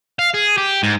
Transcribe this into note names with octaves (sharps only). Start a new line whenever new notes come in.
F5
G#4
G4
G#2